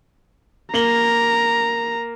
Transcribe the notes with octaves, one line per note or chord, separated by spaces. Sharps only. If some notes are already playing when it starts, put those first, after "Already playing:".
A#3 A#5 F#7 G7